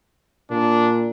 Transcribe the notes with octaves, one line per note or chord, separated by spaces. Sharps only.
A#2 D4